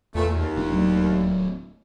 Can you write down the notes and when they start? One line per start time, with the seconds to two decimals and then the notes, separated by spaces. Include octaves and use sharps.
0.15 E2 A#2 E3 A3
0.34 D#2
0.56 D#1 F3 D4
0.72 D1 F#3 A3